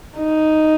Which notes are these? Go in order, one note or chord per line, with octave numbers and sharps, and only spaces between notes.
D#4